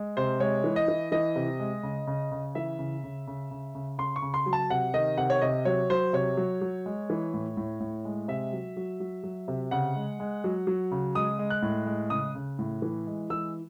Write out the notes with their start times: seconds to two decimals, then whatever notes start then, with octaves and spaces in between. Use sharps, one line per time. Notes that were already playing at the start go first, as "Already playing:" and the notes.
Already playing: G#3
0.17 C3 C5
0.40 G#3 C#5
0.64 E3
0.76 D#5
0.88 E3
1.12 E3 D#5
1.36 C3
1.60 G#3
1.83 C#3
2.07 C#3
2.32 C#3
2.55 E3 E5
2.79 C#3
3.04 C#3
3.27 C#3
3.51 C#3
3.75 C#3
3.98 C#3 C6
4.16 C#6
4.22 C#3
4.34 C6
4.46 F#3
4.53 A5
4.70 C3 F#5
4.94 D#3 D#5
5.17 C3 F#5
5.30 C#5
5.41 C3 D#5
5.65 F#3 C#5
5.90 F#3 C5
6.13 C3 C#5
6.37 F#3
6.61 F#3
6.86 G#3
7.10 E3
7.34 A2
7.57 A2
7.80 A2
8.05 G#3
8.28 C3 E5
8.53 F#3
8.77 F#3
9.00 F#3
9.24 F#3
9.48 C3
9.71 C#3 F#5
9.96 G#3
10.20 G#3
10.44 F#3
10.67 F#3
10.91 C#3
11.15 G#3 D#6
11.39 G#3
11.50 F#6
11.62 A2
11.87 G#3
12.10 C#3 D#6
12.35 C#3
12.59 A2
12.82 E3
13.07 G#3
13.30 E3 E6